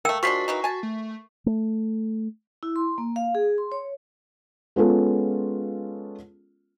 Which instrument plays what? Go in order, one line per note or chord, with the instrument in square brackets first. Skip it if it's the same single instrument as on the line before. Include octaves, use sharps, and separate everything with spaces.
[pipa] A3 A#3 [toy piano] A#4 G5 E6
[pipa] F3 G#3 D4 [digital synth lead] F#4 [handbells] C#6 B6 C7
[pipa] E3 F#3 D#4
G#5 A5
[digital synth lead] A3
[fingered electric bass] A3
[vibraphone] E4
C6
A#3
F5
G#4
C6
C#5
[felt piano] G#3 B3 C#4 F4 G#4 A4